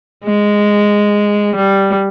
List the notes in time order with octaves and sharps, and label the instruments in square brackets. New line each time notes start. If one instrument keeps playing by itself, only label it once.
[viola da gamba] G#3
G3